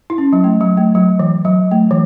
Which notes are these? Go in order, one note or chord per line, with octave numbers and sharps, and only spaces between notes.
E4
C#4
F#3
A3
F#3
A3
F#3
E3
F#3
A3
E3